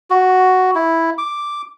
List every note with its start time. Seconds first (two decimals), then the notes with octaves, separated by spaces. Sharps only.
0.10 F#4
0.75 E4
1.18 D6